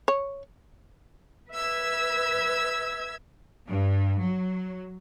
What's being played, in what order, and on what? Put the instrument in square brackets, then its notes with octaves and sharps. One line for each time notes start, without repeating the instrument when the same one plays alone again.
[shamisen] C#5
[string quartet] B4 E5 E6 G#6
[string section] G2
F#3